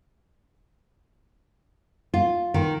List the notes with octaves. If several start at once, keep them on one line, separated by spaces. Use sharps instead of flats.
F4
D#3